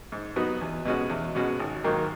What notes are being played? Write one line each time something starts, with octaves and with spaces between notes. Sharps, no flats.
G#2
F#3 B3 D#4 F#4
E2
B2 G#3 C#4 F#4
E2
B2 G#3 C#4 F#4
G#1
G#2 D#3 F#3 A#3